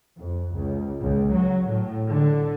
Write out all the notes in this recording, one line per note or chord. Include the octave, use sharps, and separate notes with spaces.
F2
C#2
C#2
F#3
A2
D3